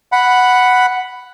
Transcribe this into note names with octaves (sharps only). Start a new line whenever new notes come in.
F#5 B5